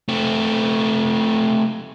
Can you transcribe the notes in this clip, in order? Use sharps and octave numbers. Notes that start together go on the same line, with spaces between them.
A3 C4